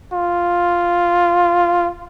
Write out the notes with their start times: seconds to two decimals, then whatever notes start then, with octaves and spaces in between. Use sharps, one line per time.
0.13 F4